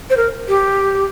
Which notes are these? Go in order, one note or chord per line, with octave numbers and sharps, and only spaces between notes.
C5
A#4
G4